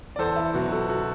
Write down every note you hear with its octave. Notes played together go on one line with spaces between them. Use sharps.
D5
E2 A4 C5
E4
B2 F#3 F#4
F#4 A4
F#4 A4